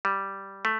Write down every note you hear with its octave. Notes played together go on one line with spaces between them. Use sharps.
G3
A3